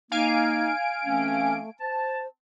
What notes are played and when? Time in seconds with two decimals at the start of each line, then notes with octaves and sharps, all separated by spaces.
0.12 A#3 D#4 F5 G#5 D7
1.05 E3 A3 C4 C#4
1.80 C5 A5